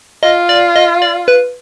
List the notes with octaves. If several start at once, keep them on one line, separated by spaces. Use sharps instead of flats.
F4 D#5
D5
D#5
D5
B4